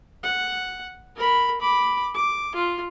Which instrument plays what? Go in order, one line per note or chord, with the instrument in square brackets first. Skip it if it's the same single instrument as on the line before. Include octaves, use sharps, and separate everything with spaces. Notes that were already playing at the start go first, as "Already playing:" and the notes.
[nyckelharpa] F#5
A#4 B5
B5 D6
D6
F4